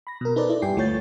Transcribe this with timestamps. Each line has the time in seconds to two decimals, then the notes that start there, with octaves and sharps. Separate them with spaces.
0.07 B5 A#6
0.21 B2 A#4
0.36 D#4 A4 B4 C5 D5
0.49 E4 D5
0.62 G2 G4 G5 G#5 C7
0.76 D2 A3 F4 C#5 G6 A6